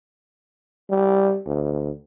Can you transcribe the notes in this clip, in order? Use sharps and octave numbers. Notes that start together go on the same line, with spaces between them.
G3
D2